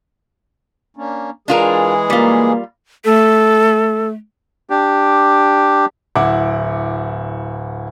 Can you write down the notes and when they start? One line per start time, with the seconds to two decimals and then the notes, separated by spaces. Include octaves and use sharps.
0.97 A#3 C#4 D4
1.48 E3 G#3 D4 F4 G#4 A#4
2.10 G3 A#3 F4
3.05 A3 A4
4.70 D4 G4
6.16 D1 E4 F#5 D6